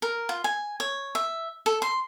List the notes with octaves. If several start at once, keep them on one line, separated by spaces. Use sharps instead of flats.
A#4
F4
G#5
C#5
E5
A4
C6